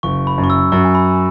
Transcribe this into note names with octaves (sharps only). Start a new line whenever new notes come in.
F#1 C#6
B5
F#2
C#6
E6
F#2 C#6
G#5
B5